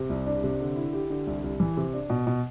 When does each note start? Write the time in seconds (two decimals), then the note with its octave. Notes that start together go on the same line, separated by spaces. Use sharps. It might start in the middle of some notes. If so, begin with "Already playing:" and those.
Already playing: C3
0.10 C2
0.26 D4
0.44 C3
0.60 D3
0.76 E4
0.93 G4
1.10 D3
1.27 C2
1.44 C2
1.60 E3
1.77 C3
1.93 D4
2.10 B2
2.27 B2